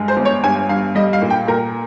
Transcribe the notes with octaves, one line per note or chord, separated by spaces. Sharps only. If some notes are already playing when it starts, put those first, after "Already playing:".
Already playing: G2 G#3
C5
G1
C#5
G2 G#5
G2 F5
G3 D#5
F5
A#2
G5
A#2 A#4